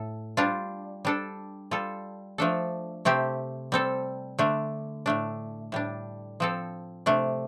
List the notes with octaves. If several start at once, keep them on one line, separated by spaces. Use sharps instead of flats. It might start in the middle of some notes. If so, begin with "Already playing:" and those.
Already playing: A2 A4
G3 D4 F4
G3 D4 A4
G3 F4 A4
F3 A3 D4 A4
C3 A3 C4 G4
G3 C4 A4
D3 A3 D4
A2 A3 D4
A2 G3 D4
F3 C4 A4
C3 A3 D4